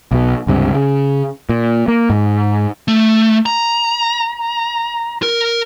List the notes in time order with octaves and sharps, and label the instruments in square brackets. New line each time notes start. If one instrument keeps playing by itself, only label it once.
[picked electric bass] B1 B2
C#2 G2 C3
C#3
A#2
A#3
G#2
[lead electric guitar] A3
A#5
A#4